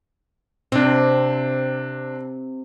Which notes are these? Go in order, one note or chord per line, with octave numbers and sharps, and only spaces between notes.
C3 C4 D4